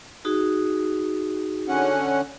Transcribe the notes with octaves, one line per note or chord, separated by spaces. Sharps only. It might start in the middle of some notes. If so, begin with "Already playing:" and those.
D#4 F#4 G#4
D3 C#4 F#5